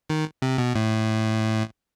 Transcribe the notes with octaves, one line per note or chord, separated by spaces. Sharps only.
D#3
C3
B2
A2